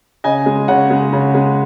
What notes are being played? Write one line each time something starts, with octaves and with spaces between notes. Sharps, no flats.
C#3 D#5 G#5
G#3
C#3 C#5 F#5
G#3
C#3
G#3